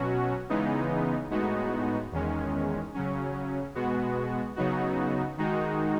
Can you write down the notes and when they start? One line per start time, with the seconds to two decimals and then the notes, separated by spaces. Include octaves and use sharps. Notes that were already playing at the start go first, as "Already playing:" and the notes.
Already playing: B2 F#3 C#4 F#4
0.49 C#3 E3 G#3 B3 D#4
1.31 A2 G#3 B3 D#4 F#4
2.12 E2 D#3 G#3 C#4
2.94 C#3 F#3 C#4
3.75 B2 G#3 B3 F#4
4.56 C#3 F#3 B3 D#4 F#4
5.38 D#3 G#3 D#4 F#4